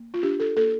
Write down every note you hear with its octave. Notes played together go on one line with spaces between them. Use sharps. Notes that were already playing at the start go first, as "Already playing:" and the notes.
Already playing: A#3
F4
D4 G4
A4
A#3 A4